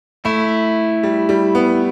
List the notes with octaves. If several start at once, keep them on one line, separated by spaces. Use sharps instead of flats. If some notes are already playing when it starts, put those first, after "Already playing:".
A3 E4
G3
G3
B3